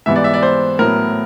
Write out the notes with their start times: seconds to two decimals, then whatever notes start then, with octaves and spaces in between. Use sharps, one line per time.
0.06 G#2 E3 G3 B3 E5
0.16 D5
0.24 E5
0.34 D5
0.43 C5
0.79 A2 F#3 B3 A#4